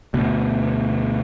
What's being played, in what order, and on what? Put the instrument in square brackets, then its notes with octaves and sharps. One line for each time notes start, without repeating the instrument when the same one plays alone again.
[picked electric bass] D2 B2